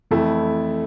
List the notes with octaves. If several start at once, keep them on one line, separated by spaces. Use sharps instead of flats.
F2 E3 A3 E4